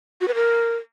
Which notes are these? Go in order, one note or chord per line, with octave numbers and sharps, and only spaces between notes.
F#4
B4
A#4